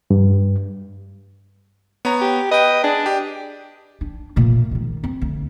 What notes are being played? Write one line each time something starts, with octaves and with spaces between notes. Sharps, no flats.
G2
B3 C#5 A#5
G4
B4 D#5 G5
D4 G#4
G4
D4
A#2 A3
C#2 D#3
C4
D2